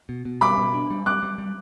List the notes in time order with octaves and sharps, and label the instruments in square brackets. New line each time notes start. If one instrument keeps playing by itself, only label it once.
[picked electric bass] B2
B2
[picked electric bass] G3 [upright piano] B5 D6
[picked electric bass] B2
D4
G3
[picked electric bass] G3 [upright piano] D6 F#6
[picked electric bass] G3
G3